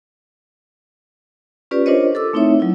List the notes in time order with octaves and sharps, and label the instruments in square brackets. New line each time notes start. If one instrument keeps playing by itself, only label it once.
[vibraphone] C#4 F4 G4 B4 D5
D4 F4 A#4 C5 C#5 D#5
A4 D6 E6
A3 C4 D#4 E4 C#5 E5
F#3 E4